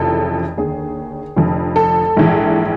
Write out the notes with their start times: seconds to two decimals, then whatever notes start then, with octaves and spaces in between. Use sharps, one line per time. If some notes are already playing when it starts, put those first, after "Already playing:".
Already playing: F1 F2 C#3 E3 A4
0.57 D#2 D3 G#4
1.36 F1 F2 D3
1.76 A4
2.17 A#1 G#2 E3